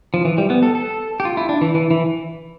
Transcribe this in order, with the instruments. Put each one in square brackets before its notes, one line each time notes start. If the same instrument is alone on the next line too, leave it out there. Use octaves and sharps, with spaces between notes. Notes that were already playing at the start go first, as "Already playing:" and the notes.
[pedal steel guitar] F3
E3
G3
B3
A4
A4
G4
F4
E4
D4
E3
E3
E3